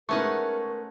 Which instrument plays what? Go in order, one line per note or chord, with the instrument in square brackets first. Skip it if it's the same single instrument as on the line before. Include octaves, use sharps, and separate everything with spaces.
[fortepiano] G#3 B3 D#4 [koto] A3 C#4 F#5 [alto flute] A#4 [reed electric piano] C#6